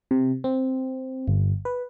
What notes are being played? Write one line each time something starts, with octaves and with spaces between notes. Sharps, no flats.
C3
C4
G1
B4